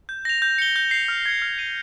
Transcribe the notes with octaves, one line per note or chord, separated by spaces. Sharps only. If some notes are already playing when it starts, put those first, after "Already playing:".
G6
A#6 F7
G6
C#7 G7
G6
C7 F7
F6
G#6 C#7
F6
C7 D#7 G7